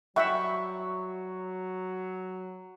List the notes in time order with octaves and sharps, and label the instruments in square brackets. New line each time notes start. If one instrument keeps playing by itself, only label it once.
[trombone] F#3 [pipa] G3 E4 [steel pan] E5 F#5 G5 [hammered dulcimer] C#6